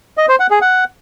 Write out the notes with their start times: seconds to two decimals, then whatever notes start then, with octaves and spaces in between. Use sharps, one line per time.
0.18 D#5
0.29 C5
0.40 F#5
0.51 G#4
0.62 F#5